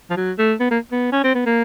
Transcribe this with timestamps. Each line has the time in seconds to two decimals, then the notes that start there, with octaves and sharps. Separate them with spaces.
0.10 F3
0.17 F#3
0.38 A3
0.60 B3
0.71 A#3
0.92 B3
1.12 C#4
1.24 C4
1.35 B3
1.46 A#3